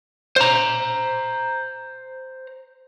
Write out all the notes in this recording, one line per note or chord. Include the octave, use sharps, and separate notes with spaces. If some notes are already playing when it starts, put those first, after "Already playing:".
C5 A#5